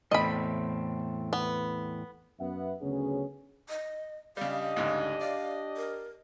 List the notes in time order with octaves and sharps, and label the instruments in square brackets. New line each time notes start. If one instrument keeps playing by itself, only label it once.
[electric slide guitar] E2 A2 C4 [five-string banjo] D#5 B5
[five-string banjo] B3
[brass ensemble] F#2 B3 E5 F#5
D2 C#3 F#3 B3 C#4 G#4
[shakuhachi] D#5
[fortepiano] C#3 G3 [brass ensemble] D4 G4 D#5 [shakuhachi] F5
[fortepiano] D2 G#2 C#3
[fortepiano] D5 [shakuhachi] F5
[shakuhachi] A#4